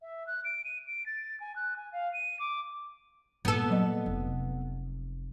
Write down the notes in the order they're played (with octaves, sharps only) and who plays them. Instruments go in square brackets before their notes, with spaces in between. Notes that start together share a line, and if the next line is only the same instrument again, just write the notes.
[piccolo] E5
F#6
D7
D#7
D7
A6
G#5
F#6
G#5
F5
D#7
D6
[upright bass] A#2 [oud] B3 A4
[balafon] F#3 D#5
[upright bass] F1